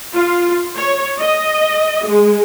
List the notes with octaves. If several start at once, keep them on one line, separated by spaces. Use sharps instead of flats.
F4
C#5
D#5
G#3